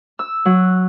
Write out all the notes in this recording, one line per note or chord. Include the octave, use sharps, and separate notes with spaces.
E6
F#3